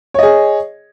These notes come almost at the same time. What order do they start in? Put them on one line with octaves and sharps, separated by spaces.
C#5 D#5 G#4